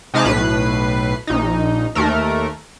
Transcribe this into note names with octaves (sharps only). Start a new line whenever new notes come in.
C3 G#3 D#4 F5 A5 D6
B1 A2 B4 C7
A#1 D#4
D#2 A3 A#4